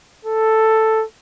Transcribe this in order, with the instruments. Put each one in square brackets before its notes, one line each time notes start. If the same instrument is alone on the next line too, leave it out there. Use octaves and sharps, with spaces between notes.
[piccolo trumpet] A4